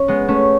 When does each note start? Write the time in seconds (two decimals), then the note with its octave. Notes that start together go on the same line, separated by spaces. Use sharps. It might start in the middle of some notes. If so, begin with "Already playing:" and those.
Already playing: C#4
0.08 G#3 B3
0.28 A3 C#4